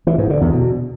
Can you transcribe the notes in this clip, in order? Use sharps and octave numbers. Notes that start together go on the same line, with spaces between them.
E3
G#2
D3
E2
B2